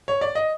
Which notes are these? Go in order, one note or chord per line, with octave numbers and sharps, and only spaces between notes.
C#5
D5
D#5